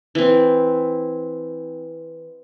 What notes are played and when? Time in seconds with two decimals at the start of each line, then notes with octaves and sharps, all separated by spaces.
0.15 E3 C4